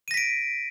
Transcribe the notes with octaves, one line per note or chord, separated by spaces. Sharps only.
A#6 B6 D7 D#7